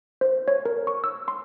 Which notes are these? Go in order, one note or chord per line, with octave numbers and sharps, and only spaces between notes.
C5
C#5
A#4
C#6
E6
C6